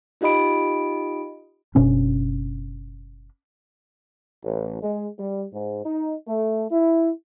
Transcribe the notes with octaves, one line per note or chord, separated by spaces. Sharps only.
D#4 F4 G4 D#5 B5 D7
F#1 B2 C#4 D4
A1
G#3
G3
G#2
D#4
A3
E4